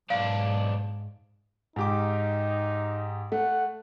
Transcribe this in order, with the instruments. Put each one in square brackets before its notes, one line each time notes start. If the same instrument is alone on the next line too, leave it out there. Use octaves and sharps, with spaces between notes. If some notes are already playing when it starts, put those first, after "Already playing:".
[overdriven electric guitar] B1 D4 [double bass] G#2 [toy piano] F5
[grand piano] G#2 G4 D6 [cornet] D#4
[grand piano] A3 [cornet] F#5